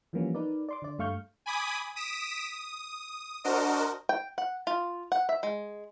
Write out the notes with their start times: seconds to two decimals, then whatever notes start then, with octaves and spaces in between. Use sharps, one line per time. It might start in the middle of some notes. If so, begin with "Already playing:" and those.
0.13 E3 F3 G3 A#3 B3 C#4
0.35 D#4 A#4 B4 D5
0.69 D5 C6 D6
0.82 D3 D5
0.99 G2 A3 F5 C#6 F6 G6
1.46 G#5 B5 D6 D#6
1.96 D#6 B6 D7 E7
2.51 D#6
3.44 D4 F#4 A#4 C5 D#5
4.09 G5
4.38 F#5
4.67 F4
5.12 F#5
5.29 E5
5.43 G#3